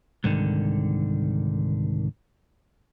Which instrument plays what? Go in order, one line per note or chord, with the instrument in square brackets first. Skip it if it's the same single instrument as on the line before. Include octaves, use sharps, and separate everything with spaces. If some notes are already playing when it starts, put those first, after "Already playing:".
[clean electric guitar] C2 G#2 D3 D#3